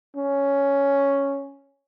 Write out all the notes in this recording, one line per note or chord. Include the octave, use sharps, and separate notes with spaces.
C#4